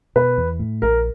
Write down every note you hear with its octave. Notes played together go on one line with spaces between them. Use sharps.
B2 B4
E2
A2
A#1 A#4